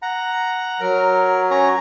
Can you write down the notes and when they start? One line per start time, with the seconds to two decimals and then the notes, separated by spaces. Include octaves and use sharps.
0.02 F#5 A#5
0.80 F#3 A#4
1.51 C#4 C#5 A#5